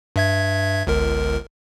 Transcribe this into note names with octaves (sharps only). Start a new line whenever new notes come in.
G2 E5 G#6
G1 C#2 A#4